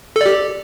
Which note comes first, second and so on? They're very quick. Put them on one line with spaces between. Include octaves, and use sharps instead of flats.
A4 D5 G4